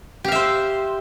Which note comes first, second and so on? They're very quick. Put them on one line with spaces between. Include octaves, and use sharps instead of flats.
G4 F5 E5 C5